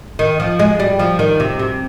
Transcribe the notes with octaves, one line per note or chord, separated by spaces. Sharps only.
D#3
F3
G#3
G3
F3
D#3
C3
C3